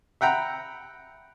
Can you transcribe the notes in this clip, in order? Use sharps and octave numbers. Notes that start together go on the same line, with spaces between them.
E5 F#5 G5 A#5 B5